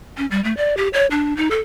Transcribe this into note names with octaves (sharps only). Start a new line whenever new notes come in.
C#4
G3
A3
D5
G4
C#5
D4
D#4
A4